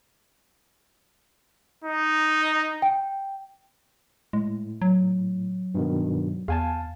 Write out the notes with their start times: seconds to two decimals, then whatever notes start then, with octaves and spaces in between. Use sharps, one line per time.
1.84 D#4
2.82 G5
4.33 A2 G#3
4.82 F#3
5.75 G2 B2 D#3
6.48 E2 F5 G#5 A5